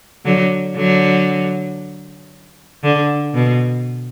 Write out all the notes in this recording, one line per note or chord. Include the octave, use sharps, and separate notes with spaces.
D3 F#3
D3 F#3
D3
B2